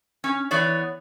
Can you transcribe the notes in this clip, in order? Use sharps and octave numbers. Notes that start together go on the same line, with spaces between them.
C#4
E3 B3 C#5 D5